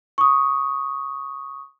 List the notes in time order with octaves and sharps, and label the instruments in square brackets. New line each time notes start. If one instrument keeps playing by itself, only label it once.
[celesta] C#6 D#6